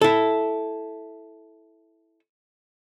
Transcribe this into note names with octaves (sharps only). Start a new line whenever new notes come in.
E4 A4